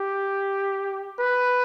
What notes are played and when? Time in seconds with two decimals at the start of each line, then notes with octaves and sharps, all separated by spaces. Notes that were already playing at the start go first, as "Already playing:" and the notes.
Already playing: G4
1.19 B4